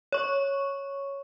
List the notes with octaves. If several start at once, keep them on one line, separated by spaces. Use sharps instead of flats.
C#5 C#6